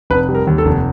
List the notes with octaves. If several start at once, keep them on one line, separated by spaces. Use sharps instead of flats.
F1 B4
G3
A#4
D#2
A4
F1